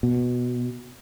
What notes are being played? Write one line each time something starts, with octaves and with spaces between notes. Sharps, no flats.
B2